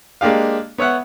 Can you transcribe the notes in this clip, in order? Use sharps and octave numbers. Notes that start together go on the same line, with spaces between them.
G#3 A#3 D4 G4 F5
B3 C#5 E5 F#5